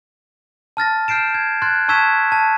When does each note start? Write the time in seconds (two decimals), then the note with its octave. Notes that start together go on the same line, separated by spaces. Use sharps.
0.77 A5 F6 A6 A#6
1.08 F6 G6 C7 D7 E7
1.34 G#6
1.62 C6 F#6 G#6 A6
1.88 A5 C#6 E6 G#6 B6 E7
2.32 A5